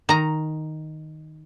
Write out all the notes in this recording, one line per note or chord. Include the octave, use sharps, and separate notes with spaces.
D#3 A#5